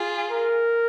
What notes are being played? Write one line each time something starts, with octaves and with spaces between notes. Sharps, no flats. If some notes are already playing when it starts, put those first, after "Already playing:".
Already playing: F4 G#4
A#4